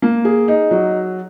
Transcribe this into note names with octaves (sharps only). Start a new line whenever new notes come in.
A#3
G#4
D#4
F#3